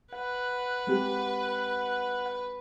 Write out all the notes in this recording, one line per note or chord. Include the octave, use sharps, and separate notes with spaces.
B4 F#5
G#3 C4 G4